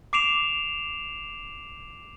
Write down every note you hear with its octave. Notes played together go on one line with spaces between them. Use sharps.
D6 C7 D7 E7 F7